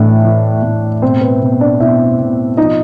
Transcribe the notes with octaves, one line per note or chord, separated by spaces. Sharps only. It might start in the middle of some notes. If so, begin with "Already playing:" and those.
Already playing: A2 E3 D4
E3
A2
B2 C4 C5
B4
B2
D4 D5
B2 E4 E5
B2
F3 D#4 D#5